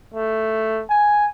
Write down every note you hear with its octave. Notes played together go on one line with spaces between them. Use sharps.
A3
G#5